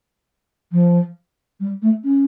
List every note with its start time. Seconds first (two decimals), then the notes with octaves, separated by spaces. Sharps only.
0.72 F3
1.60 G3
1.82 A3
2.04 C#4